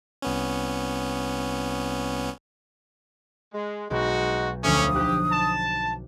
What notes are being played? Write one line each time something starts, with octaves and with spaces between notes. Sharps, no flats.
C2 B3 C#4
G#3
B1 G#3 D#4 F#4
D2 F3 A3 C#4 D6 D#6
D#4 G4 F#6
A5